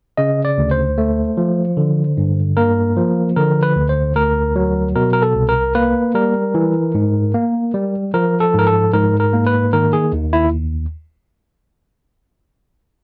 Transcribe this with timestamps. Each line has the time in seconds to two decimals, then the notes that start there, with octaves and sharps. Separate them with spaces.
0.17 C#3 D#5
0.45 D5
0.58 D2
0.71 C5
0.98 A3
1.37 F3
1.77 D3
2.17 G2
2.57 A#3 A#4
2.97 F3
3.36 D3 A#4
3.63 B4
3.76 D2
3.89 C5
4.16 D2 A#4
4.56 F#3
4.95 B2 A#4
5.13 A#4
5.22 A4
5.35 C2
5.49 A#4
5.75 A#3 B4
6.15 G3 A#4
6.55 E3
6.95 G#2
7.34 A#3
7.74 G3
8.14 F3 A#4
8.40 A4
8.54 G#2 A#4
8.67 A4
8.93 G#2 A#4
9.20 A#4
9.33 A#3
9.46 B4
9.73 D#3 A#4
9.93 G#4
10.13 D#2
10.33 E4